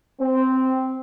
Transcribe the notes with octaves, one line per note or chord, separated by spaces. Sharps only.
C4